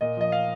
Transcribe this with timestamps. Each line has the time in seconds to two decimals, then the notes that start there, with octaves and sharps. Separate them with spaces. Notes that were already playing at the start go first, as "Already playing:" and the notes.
0.01 A#2 D#5
0.17 F3 D#5
0.32 F5